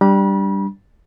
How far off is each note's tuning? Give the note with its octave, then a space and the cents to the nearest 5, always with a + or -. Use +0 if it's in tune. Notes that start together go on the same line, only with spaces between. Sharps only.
G3 +0 D4 +0 B5 -35